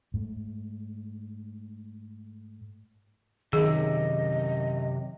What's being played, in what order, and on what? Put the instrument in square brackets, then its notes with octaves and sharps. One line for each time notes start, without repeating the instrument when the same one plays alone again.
[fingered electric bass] G#2 A3
[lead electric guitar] F#2 C3 [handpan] D#3 [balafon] G#4 [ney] D#5